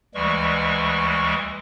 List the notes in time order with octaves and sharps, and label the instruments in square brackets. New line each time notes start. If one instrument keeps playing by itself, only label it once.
[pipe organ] D2 E3 G3 G#3 C#6